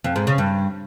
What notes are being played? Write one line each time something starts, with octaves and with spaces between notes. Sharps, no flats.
F2
G#2
C#3
G2